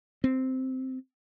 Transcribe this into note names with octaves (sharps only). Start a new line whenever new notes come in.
C4